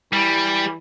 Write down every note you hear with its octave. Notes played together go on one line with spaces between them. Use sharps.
E3 G3